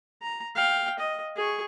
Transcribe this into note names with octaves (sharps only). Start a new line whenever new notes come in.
A#5
F5 G5
D#5
G#4 C#6